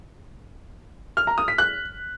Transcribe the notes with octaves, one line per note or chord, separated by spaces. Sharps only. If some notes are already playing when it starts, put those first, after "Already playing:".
F6
A#5
D#6
B6
F#6